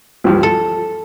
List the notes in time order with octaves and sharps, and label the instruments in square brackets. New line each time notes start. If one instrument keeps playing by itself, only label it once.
[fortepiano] C#2 G2 F3
[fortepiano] F3 [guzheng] A4